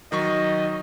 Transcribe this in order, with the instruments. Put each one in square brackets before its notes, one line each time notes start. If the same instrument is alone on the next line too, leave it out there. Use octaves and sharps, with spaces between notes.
[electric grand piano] D#3 F#3 C#6 [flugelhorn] D#5